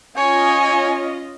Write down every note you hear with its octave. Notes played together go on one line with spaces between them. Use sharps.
C#4 F4 C#5 D#5 G#5